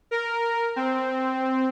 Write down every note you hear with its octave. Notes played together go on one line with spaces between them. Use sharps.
A#4
C4